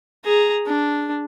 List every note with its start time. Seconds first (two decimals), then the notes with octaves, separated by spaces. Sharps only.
0.24 G#4 A#5
0.66 D4